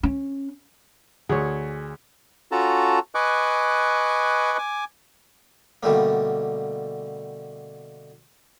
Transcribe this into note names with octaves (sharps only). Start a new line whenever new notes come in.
C#4
D2 G#4 C#5
C#4 F4 F#4 A4 A5 A#5
B4 D#5 G#5 C#6 D6 F#6
G#5 D6
B2 D3 G3 A3 A#3